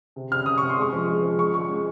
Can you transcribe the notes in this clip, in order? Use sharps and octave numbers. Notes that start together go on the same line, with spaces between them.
C3
C3 F6
C3 D#6
C3 C#6
C6
G#3 C#6
F3
G#3
F3
G#3 C#6
G#3 C#6
G#3